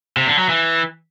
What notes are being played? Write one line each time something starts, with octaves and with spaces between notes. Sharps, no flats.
C3
D3
F#3
E3